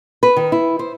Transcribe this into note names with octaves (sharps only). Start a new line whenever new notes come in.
B4
D#3
E4
C5